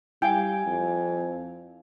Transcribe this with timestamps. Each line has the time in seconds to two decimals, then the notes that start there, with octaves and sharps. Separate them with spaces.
0.22 G3 E4 F5 G5 G#5
0.66 F2